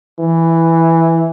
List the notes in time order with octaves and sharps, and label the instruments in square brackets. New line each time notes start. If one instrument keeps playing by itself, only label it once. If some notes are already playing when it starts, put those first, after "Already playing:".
[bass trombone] E3